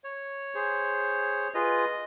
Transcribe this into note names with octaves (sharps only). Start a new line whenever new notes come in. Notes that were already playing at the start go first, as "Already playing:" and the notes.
C#5
G#4 C5
F4 G#4 B4 D#5